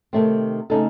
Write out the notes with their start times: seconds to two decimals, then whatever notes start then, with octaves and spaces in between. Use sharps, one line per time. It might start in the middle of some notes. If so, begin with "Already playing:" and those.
0.13 C3 D#3 A3 C4
0.70 C#3 A3 D#4 A4